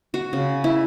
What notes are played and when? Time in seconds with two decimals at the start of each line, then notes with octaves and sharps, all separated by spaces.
0.14 F#4
0.33 C#3
0.64 E4